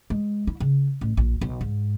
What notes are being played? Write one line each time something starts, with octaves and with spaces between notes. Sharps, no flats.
G#3
E4
C#3
A1
A#1
B1
G#2